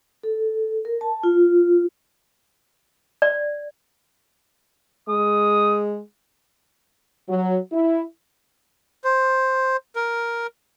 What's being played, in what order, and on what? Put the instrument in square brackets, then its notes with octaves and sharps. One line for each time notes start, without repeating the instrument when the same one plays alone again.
[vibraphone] A4
A#4
A5
F4
[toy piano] D5
[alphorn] G#3 [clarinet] D#6
[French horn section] F#3
E4
[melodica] C5
A#4